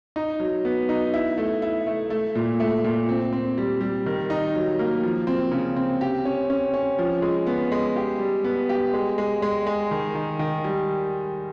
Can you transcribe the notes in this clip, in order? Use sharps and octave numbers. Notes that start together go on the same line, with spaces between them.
D#4
F#3
B3
D#4
E4
A3
E4
A3
A3
A#2
A3
A#2
C4
C4
G3
G3
D#3
D#4
F#3
A#3
F3
C4
C#3
C4
G4
C#4
C#4
C#4
F3
G#3
B3
G#3
G4
G3
B3
G4
G#3
G#3
G#3
G#3
D#3
D#3
D#3
G3